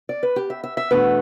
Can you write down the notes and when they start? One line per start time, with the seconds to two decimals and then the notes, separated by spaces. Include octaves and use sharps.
0.09 D5
0.23 B4
0.36 G4
0.50 E5
0.64 E5
0.77 E5
0.91 E2 B2 A3 D4 B4